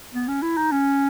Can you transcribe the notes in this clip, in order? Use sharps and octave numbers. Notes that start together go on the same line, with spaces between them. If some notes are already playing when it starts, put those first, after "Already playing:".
B3
C#4
E4
D#4
C#4